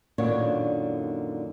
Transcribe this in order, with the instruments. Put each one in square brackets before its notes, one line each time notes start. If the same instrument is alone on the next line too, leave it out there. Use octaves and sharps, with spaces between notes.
[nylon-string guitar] F#2 A#2 D3 D#3 D4 C#5